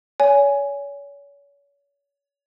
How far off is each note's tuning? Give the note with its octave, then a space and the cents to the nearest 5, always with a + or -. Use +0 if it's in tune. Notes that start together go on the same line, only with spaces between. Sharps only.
C#5 +35 G#5 +0